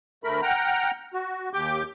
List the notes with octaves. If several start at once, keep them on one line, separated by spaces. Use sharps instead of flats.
D2 A3 A#4 B5
F#5 G5 A#5 F6
F#4
D#2 G4 D6 G6